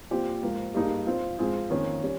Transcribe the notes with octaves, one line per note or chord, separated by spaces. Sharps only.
A#2 F3 C4 G4
G#2 F3 A#3
G2 G3 A#3 D#4 G#4
F3 C4 F4
G#2 F3 C4 F4 G#4
F2 D#3 A#3 C#4
G3 C#4